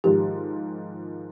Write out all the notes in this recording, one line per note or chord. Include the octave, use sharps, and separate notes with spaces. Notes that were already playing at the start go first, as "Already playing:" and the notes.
G#2 D#3 F3 G4